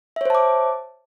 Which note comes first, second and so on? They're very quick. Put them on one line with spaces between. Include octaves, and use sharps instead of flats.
E5 C#5 C5 A5 D6